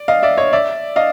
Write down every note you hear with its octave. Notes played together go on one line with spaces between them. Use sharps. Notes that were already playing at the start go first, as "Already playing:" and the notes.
Already playing: D5
D#5 F5
D5 E5
C#5 D#5
D5 E5
D#5 F5